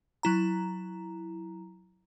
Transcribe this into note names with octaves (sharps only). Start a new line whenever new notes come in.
F#3 E4 A#5